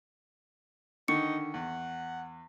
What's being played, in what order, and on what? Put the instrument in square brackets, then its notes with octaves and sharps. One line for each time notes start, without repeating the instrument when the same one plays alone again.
[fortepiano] D3 D#3 [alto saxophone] D#4 [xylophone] C#6 C#7
[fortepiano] E2 [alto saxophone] F#5